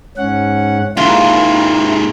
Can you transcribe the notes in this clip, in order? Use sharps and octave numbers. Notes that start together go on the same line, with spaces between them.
G#2 C#4 F#5
D#2 G#2 E4 F4